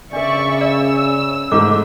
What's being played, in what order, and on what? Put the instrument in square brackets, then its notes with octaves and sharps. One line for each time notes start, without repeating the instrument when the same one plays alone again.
[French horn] C#3 [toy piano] D4 A#4 [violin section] D5 E5 C#6
[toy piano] D5 [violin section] E6
[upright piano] G#2 A3 [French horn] A4 [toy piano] D6